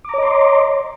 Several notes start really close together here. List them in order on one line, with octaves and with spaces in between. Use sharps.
D6 A#5 C#5 D#5 C6